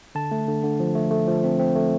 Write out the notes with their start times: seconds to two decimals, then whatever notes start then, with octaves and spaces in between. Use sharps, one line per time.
0.15 D3 A5
0.31 A3
0.47 D3
0.63 D3
0.80 F3
0.95 A3
1.11 A3
1.28 F3
1.44 C4
1.59 C4
1.76 A3